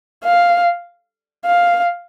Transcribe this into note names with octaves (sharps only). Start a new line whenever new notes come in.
F5
F5